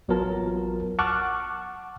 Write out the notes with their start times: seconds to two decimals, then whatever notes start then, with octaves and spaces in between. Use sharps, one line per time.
0.08 A1 F#3 B3 F4 A#4 A5
0.99 F#5 A5 C#6 D6 F6 F#6